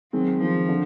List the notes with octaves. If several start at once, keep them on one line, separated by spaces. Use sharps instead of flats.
D#3 F#3 G#3 C4
D#3 F3 G#3 C4
D3